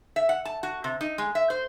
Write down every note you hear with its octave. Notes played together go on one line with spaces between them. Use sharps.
E5
F#5
A5
F#4
C3
D#4
G#3
E5
C5